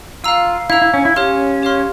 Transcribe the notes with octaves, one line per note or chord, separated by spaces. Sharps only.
F4 F5 A#5 E6
E4 F5 A#5 E6
E4
C#4
E4
C#4 G4 C#5 F5 C6 F6
G4 C#5 F5 C6 F6